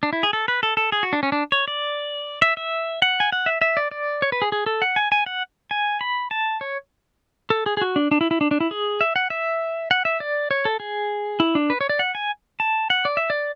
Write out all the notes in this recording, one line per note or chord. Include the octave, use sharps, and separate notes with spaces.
D4
E4
G#4
A4
B4
A4
A4
G#4
F#4
D4
C#4
D4
C#5
D5
E5
E5
F#5
G#5
F#5
E5
E5
D5
D5
C#5
B4
G#4
G#4
A4
F#5
G#5
G#5
F#5
G#5
B5
A5
C#5
A4
G#4
G#4
F#4
D4
D4
E4
E4
D4
D4
E4
G#4
E5
F#5
E5
F#5
E5
D5
C#5
A4
G#4
E4
D4
B4
C#5
D5
F#5
G#5
A5
F#5
D5
E5
D5